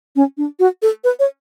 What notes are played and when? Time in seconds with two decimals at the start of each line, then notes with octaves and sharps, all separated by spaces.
0.16 C#4
0.37 D4
0.59 F#4
0.82 A4
1.04 B4
1.19 C#5